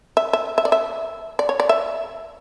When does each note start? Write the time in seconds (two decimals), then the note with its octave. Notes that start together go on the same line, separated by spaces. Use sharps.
0.17 E5
0.33 E5
0.58 E5
0.65 D5
0.72 E5
1.39 D5
1.49 C#5
1.60 D5
1.69 E5